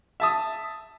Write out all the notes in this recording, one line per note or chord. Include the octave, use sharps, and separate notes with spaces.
E5 A5 D#6